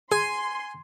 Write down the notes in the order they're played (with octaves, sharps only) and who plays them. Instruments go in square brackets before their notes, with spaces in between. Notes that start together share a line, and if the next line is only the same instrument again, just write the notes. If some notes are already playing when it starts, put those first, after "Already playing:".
[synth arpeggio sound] G#4 [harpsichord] G#5 [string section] C6